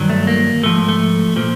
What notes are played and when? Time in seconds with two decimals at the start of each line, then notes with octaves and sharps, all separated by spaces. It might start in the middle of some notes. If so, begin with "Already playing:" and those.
Already playing: G2 D#3 F#3
0.09 A3
0.27 A#3
0.63 G#2 F3 A3
0.88 A3
1.36 A#2 F3